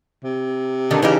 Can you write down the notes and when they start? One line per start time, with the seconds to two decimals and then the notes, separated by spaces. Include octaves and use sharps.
0.23 C3
0.90 D3 D#3 D4
1.02 C#3 E3 D#4 G4